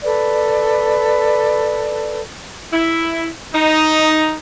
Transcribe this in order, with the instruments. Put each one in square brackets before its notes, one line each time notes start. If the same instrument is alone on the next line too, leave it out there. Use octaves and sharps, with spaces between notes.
[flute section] A4 B4 D5
[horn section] E4
D#4